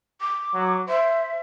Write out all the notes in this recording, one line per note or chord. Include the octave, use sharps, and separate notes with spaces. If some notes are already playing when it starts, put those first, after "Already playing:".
D6
F#3
C5 E5